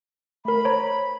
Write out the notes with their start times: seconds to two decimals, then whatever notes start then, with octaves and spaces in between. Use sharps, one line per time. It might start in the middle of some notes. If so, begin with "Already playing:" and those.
0.45 A3 A#4 B5
0.65 C5 C#5 A#5